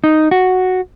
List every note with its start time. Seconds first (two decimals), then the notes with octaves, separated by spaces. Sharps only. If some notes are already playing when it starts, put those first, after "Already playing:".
0.04 D#4
0.31 F#4